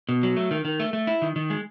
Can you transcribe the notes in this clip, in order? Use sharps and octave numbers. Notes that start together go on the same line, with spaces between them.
B2
F#3
A3
D#3
D#3
A3
A3
E4
D#3
D#3
G#3